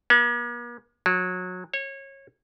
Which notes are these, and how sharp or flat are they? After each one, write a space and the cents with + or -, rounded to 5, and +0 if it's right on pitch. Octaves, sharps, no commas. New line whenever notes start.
A#3 +45
F#3 -25
C#5 -25